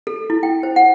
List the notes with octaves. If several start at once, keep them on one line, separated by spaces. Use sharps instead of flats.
A4
E4
G5
C5
F#5